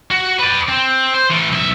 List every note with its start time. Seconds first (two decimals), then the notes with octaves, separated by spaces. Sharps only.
0.11 F#4
0.40 B4 D5
0.69 C4
1.14 C5
1.31 E3 A3
1.52 B1 E5